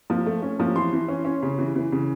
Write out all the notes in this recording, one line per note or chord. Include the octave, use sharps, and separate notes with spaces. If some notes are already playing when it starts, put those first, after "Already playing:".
F3
A3
C#4
F3
E3 C6
E3
C#4
C#4
C#3
E3
E3
C#3